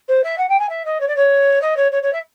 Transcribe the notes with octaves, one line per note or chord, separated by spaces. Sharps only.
C5
E5
F#5
G5
G#5
E5
D#5
C#5
D5
C#5
D#5
C#5
C#5
C#5
E5